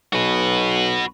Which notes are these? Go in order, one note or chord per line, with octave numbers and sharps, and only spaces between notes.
B1 F#4 B4